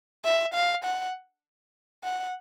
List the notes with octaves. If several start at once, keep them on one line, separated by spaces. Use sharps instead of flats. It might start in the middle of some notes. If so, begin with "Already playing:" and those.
E5
F5
F#5
F#5